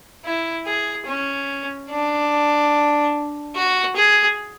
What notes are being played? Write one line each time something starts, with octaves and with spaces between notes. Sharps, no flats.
E4
G#4
C#4
D4
F#4
G#4